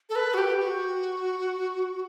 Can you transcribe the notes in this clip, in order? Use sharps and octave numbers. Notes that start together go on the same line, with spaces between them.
A4
B4
F#4
G4
F#4